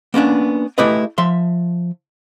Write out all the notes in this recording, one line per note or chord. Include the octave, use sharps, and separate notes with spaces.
A#3 B3 C#4 D4
A3 E4 G4 G#4 B4 D#5
F3 E5 C6